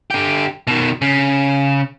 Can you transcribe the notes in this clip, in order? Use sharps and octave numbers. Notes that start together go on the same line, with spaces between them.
D3 G4
B2 D#3
C#3